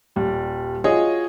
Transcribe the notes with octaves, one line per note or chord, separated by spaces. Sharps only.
D#1 G3
F4 F#4 G#4 C#5 D#5